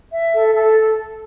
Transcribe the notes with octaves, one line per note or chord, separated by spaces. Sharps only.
E5
A4
A4